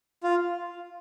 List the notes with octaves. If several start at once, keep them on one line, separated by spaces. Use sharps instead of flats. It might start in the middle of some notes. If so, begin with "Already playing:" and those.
F4